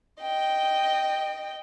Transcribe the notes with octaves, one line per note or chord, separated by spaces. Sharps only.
D#5 G5